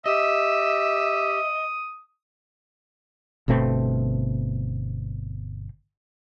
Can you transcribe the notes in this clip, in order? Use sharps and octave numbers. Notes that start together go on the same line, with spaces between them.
G4 D#5 E5 D#6
G1 B2 A3 C4